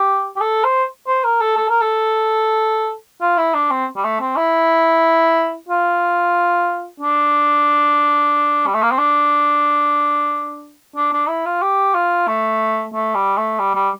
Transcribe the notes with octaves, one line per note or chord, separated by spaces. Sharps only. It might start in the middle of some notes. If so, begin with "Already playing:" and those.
Already playing: G4
G4
A4
C5
C5
A#4
A4
A4
A#4
A4
F4
E4
D4
C4
G3
A3
C4
E4
F4
D4
G3
A3
A#3
C4
D4
D4
D4
E4
F4
G4
F4
A3
A3
G3
A3
G3
G3